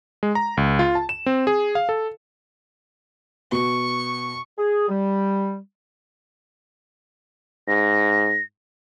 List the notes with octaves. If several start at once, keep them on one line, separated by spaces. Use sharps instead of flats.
G#3
A#5
C#2
F4
A5
E7
C4
G#4
F5
A4
B2 C#6
G#4
G3
G#2 A#6